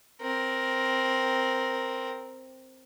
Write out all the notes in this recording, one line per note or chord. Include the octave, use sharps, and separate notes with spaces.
C4 A#4